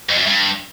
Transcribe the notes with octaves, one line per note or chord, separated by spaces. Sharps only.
F2
F#2
G2